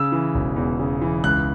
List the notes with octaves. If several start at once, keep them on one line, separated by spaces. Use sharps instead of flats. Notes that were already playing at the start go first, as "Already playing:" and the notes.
Already playing: C#3 E6
E3
E1
E2
C#3
E3
C#2 F#6